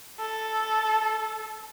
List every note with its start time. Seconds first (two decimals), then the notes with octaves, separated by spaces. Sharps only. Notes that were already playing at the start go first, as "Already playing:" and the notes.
0.20 A4